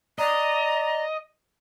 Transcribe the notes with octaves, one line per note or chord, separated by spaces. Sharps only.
D5 D#5 A#5